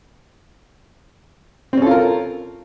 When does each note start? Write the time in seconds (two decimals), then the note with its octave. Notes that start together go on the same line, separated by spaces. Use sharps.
1.73 C4
1.77 C#4
1.82 A4
1.87 F4
1.91 A#4